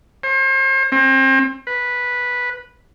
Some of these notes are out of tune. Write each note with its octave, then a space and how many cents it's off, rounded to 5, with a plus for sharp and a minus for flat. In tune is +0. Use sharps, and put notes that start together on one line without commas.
C5 +40
C4 +35
B4 -5